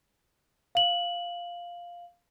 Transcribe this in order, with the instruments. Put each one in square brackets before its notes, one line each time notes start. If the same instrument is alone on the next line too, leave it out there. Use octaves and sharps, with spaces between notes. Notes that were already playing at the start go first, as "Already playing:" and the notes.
[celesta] F5 F#7